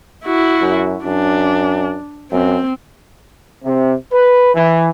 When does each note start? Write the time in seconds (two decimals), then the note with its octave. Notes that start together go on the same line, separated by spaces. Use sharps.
0.25 E4 F#4
0.62 F#2
1.05 F#2 D4
2.32 F#2 C4
3.64 C3
4.12 B4
4.54 E3